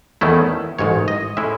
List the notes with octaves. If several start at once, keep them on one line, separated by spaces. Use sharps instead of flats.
E2 D#3 A3 C#4 E4
A1 G#2 D#3 C#5
D#5
A2 G#3 C#4 E4 E5